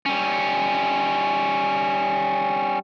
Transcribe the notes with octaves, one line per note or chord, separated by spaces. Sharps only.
G3 C#4